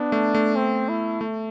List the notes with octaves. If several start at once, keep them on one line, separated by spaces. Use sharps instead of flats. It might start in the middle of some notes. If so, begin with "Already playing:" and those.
Already playing: B3 D4
A3
A3
C4
E4
A3